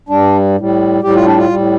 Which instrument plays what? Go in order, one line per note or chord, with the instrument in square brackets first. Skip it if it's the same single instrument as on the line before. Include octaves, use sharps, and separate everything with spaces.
[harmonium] G2 G3 D4
A2 G3
A2 G3 G4
F4
D4
F4
A2 G3